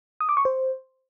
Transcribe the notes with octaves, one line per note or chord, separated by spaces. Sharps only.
D#6
D6
C#6
C5